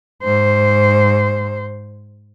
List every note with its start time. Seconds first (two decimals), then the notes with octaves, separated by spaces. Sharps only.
0.24 G#2 C5